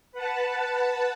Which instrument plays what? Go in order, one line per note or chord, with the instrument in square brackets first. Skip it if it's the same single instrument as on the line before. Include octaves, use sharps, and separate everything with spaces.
[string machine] B4 F#5 A5